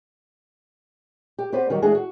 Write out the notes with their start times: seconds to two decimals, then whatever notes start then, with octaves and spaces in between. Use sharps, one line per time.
1.39 G4
1.52 B3 C4 G4 B4 C5 D5
1.70 D#3 F#3 G3 D#4 F#4
1.82 E3 G#3 A3 D4 G#4
1.95 F#4